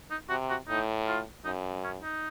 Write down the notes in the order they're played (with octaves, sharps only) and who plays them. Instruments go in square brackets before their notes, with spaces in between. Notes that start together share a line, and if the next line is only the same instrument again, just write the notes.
[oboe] D#4
[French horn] C3 [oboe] F#4
[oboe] F#4
[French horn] A2 [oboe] D#4
[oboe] F4
[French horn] F#2 [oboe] D#4
[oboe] C#4
D#4